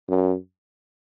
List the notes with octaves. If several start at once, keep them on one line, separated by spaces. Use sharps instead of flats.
F#2